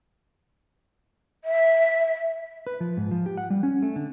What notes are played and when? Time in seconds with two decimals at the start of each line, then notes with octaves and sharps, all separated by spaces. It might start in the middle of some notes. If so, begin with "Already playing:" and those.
1.44 E5
2.67 B4
2.81 F3
2.97 G#2
3.11 F3
3.26 G4
3.37 F#5
3.50 G3
3.63 C#4
3.82 A3
3.96 D3